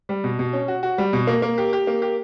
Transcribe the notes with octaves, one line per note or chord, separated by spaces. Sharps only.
G3
B2
B2
C#4
F#4
F#4
G3
B2
A#3
A#3
G4
G4
A#3
G4